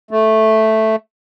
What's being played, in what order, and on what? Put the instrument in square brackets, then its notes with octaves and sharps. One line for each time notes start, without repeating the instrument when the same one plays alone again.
[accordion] A3